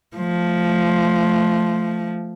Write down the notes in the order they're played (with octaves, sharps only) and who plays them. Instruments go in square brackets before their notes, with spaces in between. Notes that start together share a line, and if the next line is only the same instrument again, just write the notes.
[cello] F3 A3